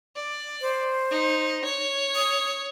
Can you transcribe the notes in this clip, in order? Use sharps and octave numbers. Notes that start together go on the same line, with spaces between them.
D5
C5
D#4
C#5
D#6